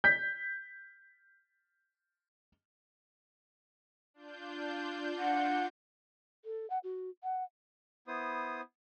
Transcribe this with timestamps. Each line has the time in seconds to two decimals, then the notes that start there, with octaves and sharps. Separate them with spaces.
0.04 G6 B6
4.14 D4 F4 G6
5.18 F#5
6.45 A4
6.70 F#5
6.83 F#4
7.23 F#5
8.07 B3 E4 C5 D#6